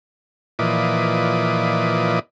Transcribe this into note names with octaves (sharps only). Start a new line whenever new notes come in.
A#2 E3 F3 B4 D5 D#5